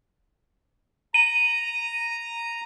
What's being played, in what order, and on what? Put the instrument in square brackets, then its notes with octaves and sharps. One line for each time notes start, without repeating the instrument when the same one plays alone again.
[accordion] A#5 [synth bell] D#7